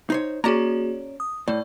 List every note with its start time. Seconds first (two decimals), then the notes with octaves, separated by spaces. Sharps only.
0.10 D#4 C5 C#5
0.44 A#3 C#4 F#4 G#4 D5 A#5
1.20 D#6
1.48 A2 A3 D5